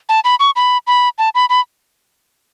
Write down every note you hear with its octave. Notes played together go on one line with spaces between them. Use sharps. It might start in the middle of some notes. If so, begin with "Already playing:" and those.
A5
B5
C#6
B5
B5
A5
B5
B5